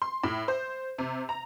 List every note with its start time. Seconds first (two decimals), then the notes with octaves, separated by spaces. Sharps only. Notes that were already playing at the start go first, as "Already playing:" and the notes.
0.02 C6
0.24 A2
0.48 C5
0.98 C3
1.29 A#5